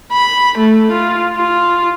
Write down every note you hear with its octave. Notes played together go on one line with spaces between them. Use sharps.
B5
A3
F4
F4